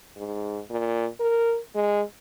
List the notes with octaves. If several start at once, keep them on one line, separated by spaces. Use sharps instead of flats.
G#2
A#2
A#4
G#3